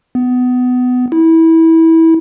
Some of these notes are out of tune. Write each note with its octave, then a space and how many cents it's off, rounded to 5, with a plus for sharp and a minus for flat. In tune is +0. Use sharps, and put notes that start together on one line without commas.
B3 +20
E4 -20